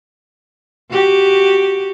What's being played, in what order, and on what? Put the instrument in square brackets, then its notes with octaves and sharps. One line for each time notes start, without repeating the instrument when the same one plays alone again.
[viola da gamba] F#4 G4